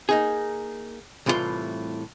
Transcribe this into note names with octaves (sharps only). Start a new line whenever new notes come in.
A#3 D#4 G#4
C2 A2 E3 F4 G4 C6